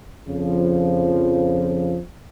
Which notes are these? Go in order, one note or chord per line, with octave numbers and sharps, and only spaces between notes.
F2 C#3 F3